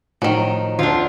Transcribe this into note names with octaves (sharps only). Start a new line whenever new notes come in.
A2 D#3 F3 F#3
D2 D4 F4